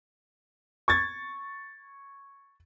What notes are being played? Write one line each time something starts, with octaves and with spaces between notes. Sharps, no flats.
C#6 G#6 A6